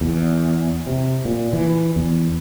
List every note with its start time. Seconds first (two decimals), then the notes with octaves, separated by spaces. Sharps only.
0.01 E2
0.87 C3
1.25 A#2
1.53 E3
1.96 E2